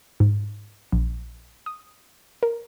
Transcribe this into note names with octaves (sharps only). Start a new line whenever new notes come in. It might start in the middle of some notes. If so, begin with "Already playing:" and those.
G#2
A#1
D#6
A#4